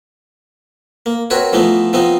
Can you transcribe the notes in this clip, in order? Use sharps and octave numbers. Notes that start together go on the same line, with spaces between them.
A#3
C4 F#4 A#4 B4 C#5
E3 F3 A3 B3 D#4
F3 B3 C4 D#4 D#5